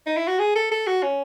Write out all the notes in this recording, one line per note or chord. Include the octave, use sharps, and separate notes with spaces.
D#4
E4
F#4
G#4
A4
A4
F#4
C#4